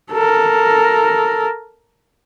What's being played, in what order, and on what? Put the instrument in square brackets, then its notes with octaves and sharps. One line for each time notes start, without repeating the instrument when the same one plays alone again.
[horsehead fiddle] A4 A#4